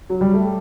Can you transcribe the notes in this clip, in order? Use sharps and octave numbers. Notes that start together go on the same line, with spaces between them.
F#3
G3
A3